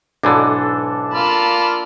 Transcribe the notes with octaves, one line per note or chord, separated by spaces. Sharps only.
B1 G#2 E3 D4 A4
A#3 F4 A5 B5